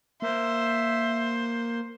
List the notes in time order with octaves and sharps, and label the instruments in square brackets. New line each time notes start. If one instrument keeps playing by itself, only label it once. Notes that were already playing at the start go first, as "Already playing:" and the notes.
[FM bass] A#3 [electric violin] C5 [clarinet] E5